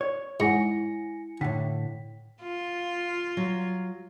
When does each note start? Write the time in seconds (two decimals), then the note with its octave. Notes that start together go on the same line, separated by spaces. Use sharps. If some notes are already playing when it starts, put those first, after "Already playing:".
0.01 C#5
0.40 G#2 E4 F#5 G#5 A#6 C#7
1.41 A2 D3 G5 B6
2.42 F4
3.37 F#3